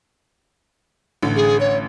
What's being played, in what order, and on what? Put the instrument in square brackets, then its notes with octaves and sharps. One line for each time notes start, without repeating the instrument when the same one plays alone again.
[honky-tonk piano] A1 D3
[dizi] G#4
C#5